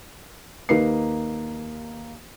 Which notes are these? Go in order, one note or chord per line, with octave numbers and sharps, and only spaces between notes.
D#2 A#3 D#4 B4 C7